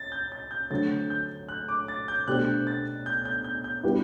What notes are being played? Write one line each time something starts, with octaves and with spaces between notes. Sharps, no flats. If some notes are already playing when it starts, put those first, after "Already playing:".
Already playing: A6
G6
A6
G6
D3 F#3 A3 C4 A6
G6
F#6
D6
A6
G6
B2 A3 D4 G4 C5 F#6
A6
G6
G6
G6
G6
G3 B3 E4 G4 B4